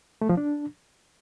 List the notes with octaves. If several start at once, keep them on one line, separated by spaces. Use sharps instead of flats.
A3
F3
D4